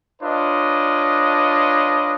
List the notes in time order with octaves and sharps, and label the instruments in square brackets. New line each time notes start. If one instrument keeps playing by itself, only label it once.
[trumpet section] D4 F4 B4 C#5 D#5